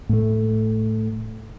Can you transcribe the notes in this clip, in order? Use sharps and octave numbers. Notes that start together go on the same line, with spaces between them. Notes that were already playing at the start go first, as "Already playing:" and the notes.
A2 A3